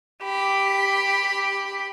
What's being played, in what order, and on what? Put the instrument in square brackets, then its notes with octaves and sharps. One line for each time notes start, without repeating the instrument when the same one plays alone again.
[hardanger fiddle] G4 B5